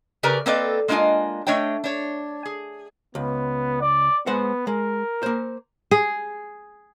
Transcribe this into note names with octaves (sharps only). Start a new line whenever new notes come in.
C#3 G4 A#4 B4 D5 A#5
A#3 C4 A4 B4 D5 D#5
G#3 A#3 D4 F4 D#5 G#5
A3 D4 C#5 D#5 G5
D4 C#5
G#4
C#2 B3
D5
G#3 B3 C5 F#5
G#3 A#4
A#3 C5
G#4